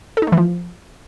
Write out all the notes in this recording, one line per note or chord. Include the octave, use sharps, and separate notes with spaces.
A4
D#4
A3
E3
F3